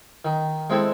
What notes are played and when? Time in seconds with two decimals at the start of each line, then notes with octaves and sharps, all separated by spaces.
0.25 D#3
0.70 G#3 C4 E4 A4